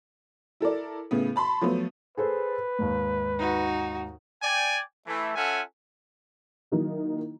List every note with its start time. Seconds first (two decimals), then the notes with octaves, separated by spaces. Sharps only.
0.60 E4 A4 A#4 D5
1.11 A2 C#3 B3
1.36 A5 B5 C6
1.61 F3 F#3 A3 B3
2.17 G#4 A4 B4 C5
2.79 D#2 G#2
3.39 D#4 F#4
4.43 D5 G5 G#5
5.07 E3 A3
5.36 C#4 F4 A4 E5 F#5 G#5
6.72 D#3 F#3 A#3 D#4 E4